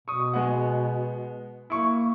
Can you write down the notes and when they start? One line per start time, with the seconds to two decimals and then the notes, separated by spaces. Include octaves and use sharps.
0.08 B2 C#6 D#6
0.33 G#3 B3 F#5
1.70 A#3 E4 C#6